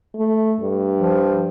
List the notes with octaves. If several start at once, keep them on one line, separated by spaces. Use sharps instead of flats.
A3
G2
F3